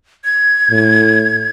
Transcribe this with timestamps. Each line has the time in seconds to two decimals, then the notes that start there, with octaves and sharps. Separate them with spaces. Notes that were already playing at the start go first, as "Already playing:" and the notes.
0.25 G#6
0.71 A2